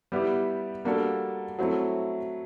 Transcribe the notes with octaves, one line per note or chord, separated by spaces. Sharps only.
G3 B3 E4 G4
G3 A#3 D4 F#4 A4
F#3 A3 C4 E4